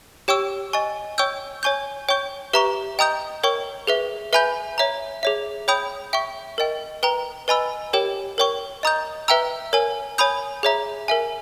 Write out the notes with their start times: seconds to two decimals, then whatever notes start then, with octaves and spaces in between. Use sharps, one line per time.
0.28 G4 C#5 G5 C#6 E6
0.73 D#5 G#5 C#6
1.18 C#5 G5 C#6 E6 G6
1.63 C#5 G#5 C#6 G6
2.09 C#5 G5 C#6 G6
2.53 G4 B4 E5 A#5 C#6
2.99 D#5 G5 A#5 D#6 G6
3.43 A#4 C#5 G5 C#6
3.87 G#4 B4 E5
4.33 B4 E5 G#5 B5 G6
4.78 C#5 E5 A#5
5.23 G#4 C#5 E5
5.68 C#5 G5 B5 D#6 G6
6.13 E5 G5 C#6
6.58 A#4 D#5 G5
7.03 B4 G5 A#5
7.48 B4 D#5 G#5 B5 E6
7.93 G4 A#4 C#5 G5
8.38 A#4 C#5 G5 C#6
8.83 D#5 A#5 D#6 G6
9.28 B4 E5 G5 A#5 E6
9.73 A#4 C#5 G#5
10.18 C#5 G#5 B5 D#6 G6
10.63 G#4 C#5 E5 A#5
11.08 A#4 E5 G#5